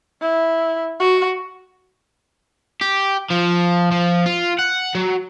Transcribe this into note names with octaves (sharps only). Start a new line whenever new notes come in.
E4
F#4
G4
F3
F3
F4
F#5
F#3